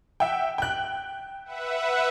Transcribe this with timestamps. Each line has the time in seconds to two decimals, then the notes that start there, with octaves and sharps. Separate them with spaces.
0.20 E5 F#5 G5
0.58 G5 F#6
1.45 B4 E5 F#5